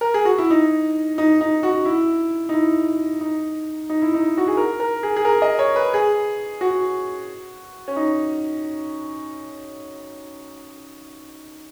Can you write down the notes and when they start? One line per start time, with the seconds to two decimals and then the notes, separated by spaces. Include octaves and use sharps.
0.01 A#4
0.14 G#4
0.25 F#4
0.38 E4
0.50 D#4
1.18 D#4
1.41 D#4
1.63 F#4
1.86 E4
2.49 D#4
2.53 E4
3.21 D#4
3.90 D#4
4.02 E4
4.14 D#4
4.37 F#4
4.48 G#4
4.57 A#4
4.80 A#4
5.03 G#4
5.16 G#4
5.25 A#4
5.42 D#5
5.59 C#5
5.76 B4
5.94 G#4
6.61 F#4
7.88 C#4
7.96 D#4